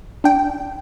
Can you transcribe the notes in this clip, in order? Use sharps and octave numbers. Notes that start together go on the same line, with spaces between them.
D4 G5